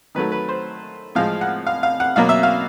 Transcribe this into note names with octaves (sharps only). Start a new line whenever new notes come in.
D#3 F#3 A3 B4
B4
C5
A2 F3 G#3 F5
F#5
F5
F5
F#5
B2 F#3 A#3 F5
E5
F5